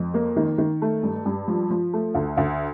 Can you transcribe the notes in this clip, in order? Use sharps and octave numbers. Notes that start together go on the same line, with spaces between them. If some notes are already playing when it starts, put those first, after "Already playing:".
Already playing: F2
A#3
D#3
D#3
A3
G2
G2
F3
F3
A3
D2
D2